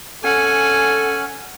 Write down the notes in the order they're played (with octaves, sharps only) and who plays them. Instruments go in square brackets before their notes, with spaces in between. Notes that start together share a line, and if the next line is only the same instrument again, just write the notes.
[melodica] C#4 [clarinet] A4 [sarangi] F#5 [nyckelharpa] G#5